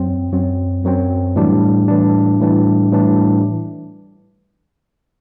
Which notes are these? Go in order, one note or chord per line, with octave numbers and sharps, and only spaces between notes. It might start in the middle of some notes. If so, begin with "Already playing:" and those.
Already playing: F#2 F#3 C4
F#2 F#3 C4
F#2 F#3 C4
A2 E3 G3 D4
A2 E3 G3 D4
A2 E3 G3 D4
A2 E3 G3 D4